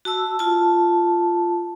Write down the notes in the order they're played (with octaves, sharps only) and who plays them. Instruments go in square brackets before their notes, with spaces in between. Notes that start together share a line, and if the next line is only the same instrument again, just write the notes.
[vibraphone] F#4 A5 E6
F4 A5